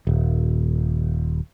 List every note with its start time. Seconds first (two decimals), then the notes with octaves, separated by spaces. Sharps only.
0.07 D#1